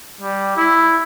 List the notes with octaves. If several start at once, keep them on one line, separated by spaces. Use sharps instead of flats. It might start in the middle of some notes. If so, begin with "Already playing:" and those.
G3
E4